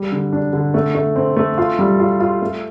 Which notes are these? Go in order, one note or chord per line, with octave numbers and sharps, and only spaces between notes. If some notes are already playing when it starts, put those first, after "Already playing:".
Already playing: G3
D3
D4
D3
A3
A3
C4
A3
F4
G3
F4
F4
A3